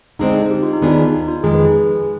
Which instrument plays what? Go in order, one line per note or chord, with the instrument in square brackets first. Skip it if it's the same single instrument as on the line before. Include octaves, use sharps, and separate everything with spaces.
[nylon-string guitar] D3 G#3 C4 [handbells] D#4
[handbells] D#4
G4
F4
D#4
[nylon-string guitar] D#2 D#3 B3 D4 G#4 [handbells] F4
[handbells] D#4
F4
[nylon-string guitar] F2 D#3 G#3 [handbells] G#4
[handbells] B4
G#4
B4